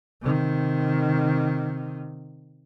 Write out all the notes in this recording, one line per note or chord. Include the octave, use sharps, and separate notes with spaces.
C3 D#3